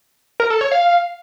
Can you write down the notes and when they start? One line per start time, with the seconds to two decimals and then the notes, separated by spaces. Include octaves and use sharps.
0.40 A#4
0.50 A4
0.61 C#5
0.72 F5